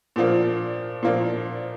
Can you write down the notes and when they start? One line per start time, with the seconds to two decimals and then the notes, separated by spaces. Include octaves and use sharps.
0.16 A#2 F3 A#3 D4
1.03 A#2 F3 A#3 D4